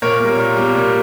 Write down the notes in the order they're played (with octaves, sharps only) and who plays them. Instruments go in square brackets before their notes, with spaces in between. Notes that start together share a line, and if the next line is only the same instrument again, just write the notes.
[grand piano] A#2 A#4 C#5
G3 A#3
A#2
G3 A#3
A#2